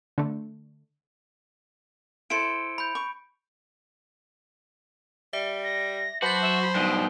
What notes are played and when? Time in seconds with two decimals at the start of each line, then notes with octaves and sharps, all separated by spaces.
0.18 D3 A3
2.30 E4 A4 C5 C#7 D7
2.78 B5 G6
2.95 C#6
5.33 G3 E5
5.63 A#6
6.22 F#3 F#4 C5 B5 A6
6.41 E5
6.62 B5
6.75 G2 B2 D#4 G5